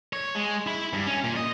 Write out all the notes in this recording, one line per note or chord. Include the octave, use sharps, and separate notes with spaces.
C#5
G#3
E4
G2
C#4
A#2
D#5